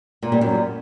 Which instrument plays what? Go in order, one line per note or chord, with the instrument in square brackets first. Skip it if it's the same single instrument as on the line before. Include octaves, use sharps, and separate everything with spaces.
[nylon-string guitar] A#2
G3
F#2